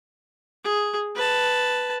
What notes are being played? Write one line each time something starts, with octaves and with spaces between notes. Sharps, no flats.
G#4
B4 A5